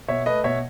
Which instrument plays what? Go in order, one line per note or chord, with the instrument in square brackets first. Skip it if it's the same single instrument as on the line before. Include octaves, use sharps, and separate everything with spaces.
[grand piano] B2 C#5 E5
A3 B4 D#5
B2 C#5 E5